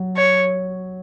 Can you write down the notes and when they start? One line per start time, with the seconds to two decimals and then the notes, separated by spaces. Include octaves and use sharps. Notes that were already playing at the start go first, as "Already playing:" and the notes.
Already playing: F#3
0.17 C#5